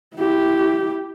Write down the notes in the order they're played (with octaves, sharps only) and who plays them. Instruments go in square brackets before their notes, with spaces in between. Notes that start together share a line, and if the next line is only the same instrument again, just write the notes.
[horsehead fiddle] E4 G4